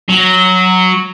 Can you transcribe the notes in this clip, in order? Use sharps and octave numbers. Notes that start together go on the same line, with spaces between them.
F#3